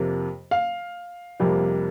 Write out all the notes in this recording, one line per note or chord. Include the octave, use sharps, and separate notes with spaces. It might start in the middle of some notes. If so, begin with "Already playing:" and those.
Already playing: F2 C3 A#3
F5
F2 C3 G3 A#3